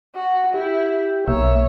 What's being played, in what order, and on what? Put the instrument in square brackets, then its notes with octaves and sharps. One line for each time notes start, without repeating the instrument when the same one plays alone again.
[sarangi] F#4
[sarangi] E4 [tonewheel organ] G4
[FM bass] B1 [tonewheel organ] A#3 E5 [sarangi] C#5